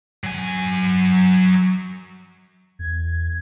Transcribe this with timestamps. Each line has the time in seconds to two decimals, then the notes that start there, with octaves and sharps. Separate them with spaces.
0.24 F#3 G#5
2.79 E2 G#6